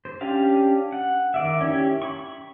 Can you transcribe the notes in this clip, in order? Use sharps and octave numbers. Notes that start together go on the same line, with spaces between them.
C5
C#4 D4 G4 F5
F#5
D#3 D5 E5
C#4 E4 G4 C#5
B5 C#6